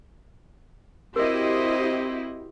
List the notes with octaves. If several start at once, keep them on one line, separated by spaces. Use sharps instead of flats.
C4 E4 F#4 G4 A#4 C5 D#5